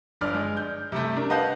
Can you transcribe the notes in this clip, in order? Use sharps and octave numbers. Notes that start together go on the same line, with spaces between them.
G1 G2 D5 F6
G#3
G6
C3 G3 A3
D4 A#4
B4 D#5 F5 F#5 A5 G6